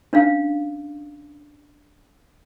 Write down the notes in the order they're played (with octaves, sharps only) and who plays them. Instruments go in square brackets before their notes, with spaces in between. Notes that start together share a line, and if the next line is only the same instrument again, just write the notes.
[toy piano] C#4 D4 F5